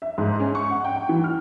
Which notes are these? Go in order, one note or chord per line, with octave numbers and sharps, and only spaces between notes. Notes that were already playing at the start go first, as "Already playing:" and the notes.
E5
G#2
C#4
C#6
F#5
G5
G5
E3
F6